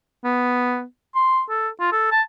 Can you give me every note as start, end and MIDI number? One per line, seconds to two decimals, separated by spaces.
0.25 0.83 59
1.15 1.42 84
1.50 1.69 69
1.80 1.90 65
1.92 2.10 69
2.12 2.22 81